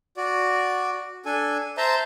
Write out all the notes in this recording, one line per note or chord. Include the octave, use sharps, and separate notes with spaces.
F#4 D5
D4 A4 G#5
C5 E5 A5 A#5 C6